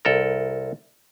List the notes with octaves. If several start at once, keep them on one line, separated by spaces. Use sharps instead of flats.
C2 A4 A#4